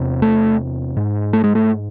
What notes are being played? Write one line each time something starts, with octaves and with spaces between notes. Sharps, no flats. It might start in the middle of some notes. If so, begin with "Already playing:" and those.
Already playing: E2 C3
A3
G#2
A3
G#3
A3